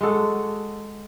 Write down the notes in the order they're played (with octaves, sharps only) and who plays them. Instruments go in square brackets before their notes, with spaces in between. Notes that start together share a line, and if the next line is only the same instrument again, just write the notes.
[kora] G#3 F#4 A4 F#5